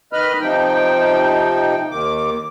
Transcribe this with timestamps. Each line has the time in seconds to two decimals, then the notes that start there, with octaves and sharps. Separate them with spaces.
0.13 D#3 B4 D#5 B5 F6
0.40 C3 F3 D#4 G5
1.91 D#2 D#3 D6